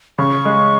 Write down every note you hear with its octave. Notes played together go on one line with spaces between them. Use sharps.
C#3 C#6
G#3